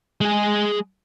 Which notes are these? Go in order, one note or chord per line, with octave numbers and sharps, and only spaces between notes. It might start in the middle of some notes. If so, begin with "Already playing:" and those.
G#3 G#4